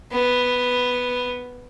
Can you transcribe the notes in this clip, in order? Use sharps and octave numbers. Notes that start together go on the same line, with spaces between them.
B3